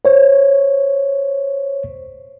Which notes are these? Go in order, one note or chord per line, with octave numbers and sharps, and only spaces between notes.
C5 C#5